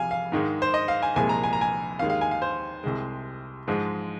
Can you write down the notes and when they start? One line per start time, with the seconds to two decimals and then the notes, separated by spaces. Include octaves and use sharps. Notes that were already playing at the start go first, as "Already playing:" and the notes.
Already playing: C2 C3 F3 F5 G#5
0.11 F5
0.32 G#2 D#3 G#3
0.62 C5
0.74 D#5
0.88 F5
1.03 G#5
1.16 C2 A#2 F3 G#3 G#5
1.29 A#5
1.43 G#5
1.53 A#5
1.61 G#5
1.99 D#2 D#3 G#3 F5
2.10 F5
2.21 G#5
2.31 F5
2.42 C5
2.84 C2 C3 G#3
3.68 G#2 F3 G#3